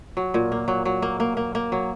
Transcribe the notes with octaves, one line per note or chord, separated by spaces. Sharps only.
F#3
A#2
A#3
F#3
F#3
A#3
A#3
A#3
A#3
F#3